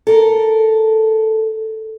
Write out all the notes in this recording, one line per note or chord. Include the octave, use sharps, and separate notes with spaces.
A4 A#4